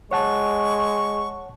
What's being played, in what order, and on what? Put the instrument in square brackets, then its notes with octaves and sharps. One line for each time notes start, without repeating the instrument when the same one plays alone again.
[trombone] G#3 [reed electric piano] C#5 F#5 A5 [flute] C#6